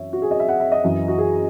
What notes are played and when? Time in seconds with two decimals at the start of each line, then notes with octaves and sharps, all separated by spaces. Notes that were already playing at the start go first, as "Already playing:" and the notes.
Already playing: F#2 E3 C#5 E5
0.13 F#4
0.22 G#4
0.31 D#5
0.40 E5
0.49 F#5
0.60 E5
0.72 D#5
0.84 F#2 E3
1.08 F#4
1.18 G#4